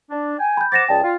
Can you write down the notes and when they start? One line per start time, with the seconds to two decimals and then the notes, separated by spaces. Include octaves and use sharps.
0.10 D4
0.39 G5 G#5
0.57 B5 G6
0.72 C5 F#5 D6 A6 A#6 E7
0.89 C#2 G#4 D5 G5 A5
1.03 F4